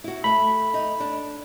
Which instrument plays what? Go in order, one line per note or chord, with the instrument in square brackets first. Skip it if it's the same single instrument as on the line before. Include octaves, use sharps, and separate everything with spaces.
[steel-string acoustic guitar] E4 F#4
[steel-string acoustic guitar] A3 E5 [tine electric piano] B5
[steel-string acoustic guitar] D#4
D4